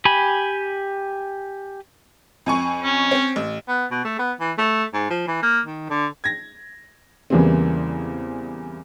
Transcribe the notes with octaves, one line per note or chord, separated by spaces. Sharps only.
G4 G#5 B5
F2 G#5 C#6
C#4
C4
A1
B3
B2
A3
B3
E3
A3
G#2
F3
E3
A#3
D#3
D3
G#6 A#6
E2 C#3 E3 G3 A#3 C4